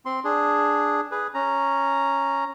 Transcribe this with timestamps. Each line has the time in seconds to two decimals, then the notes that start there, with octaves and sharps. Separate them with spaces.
0.05 C4 C6
0.24 D4 G#4
1.11 G#4 B4
1.34 C#4 A#5